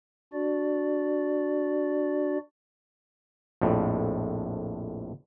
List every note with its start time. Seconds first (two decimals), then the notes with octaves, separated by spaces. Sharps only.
0.33 D4 F#4 D5
3.62 A#1 F2 A2